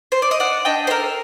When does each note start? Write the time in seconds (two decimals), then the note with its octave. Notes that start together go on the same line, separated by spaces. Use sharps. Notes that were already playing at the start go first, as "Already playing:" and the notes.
0.12 C5
0.22 D5
0.31 D#5
0.40 D4 D5 F#5
0.65 D4 D#5 G5
0.87 C5
0.90 A4 A#4